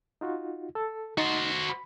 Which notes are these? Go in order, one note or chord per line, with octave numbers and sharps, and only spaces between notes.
D#4 F4 F#4
A4
D#4 F#4 C5 A6
B5